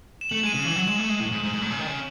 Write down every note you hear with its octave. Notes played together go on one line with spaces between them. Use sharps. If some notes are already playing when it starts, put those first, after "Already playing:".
E7
A3 F#7
E7
G#3 D#7
C#3 E7
E3 F#7
E7
F#3
F#7
G#3 E7
A3
G#3
A2
G#2
G#2
G#2 F#7
A2
C#3
D#3
C#3